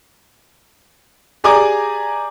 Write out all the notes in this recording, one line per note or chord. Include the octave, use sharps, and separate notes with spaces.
G4 G#4 D5 G#5 A#5 D6